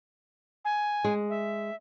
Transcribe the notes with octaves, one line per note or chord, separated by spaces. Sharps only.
G#5
G#3
E5